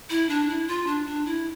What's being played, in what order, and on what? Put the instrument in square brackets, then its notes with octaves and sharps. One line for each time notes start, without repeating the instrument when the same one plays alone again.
[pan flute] E4
D4
E4
F4
D4
D4
E4